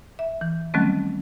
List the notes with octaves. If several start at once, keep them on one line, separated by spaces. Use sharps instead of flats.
E5
E3
D#3 F#3 G3 A3 C4 C#4